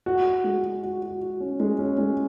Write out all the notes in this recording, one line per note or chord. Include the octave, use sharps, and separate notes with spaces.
F#4
F#4
G#3
F#4
F#4
F#4
F#4
C#4
G#3
C#4
G#3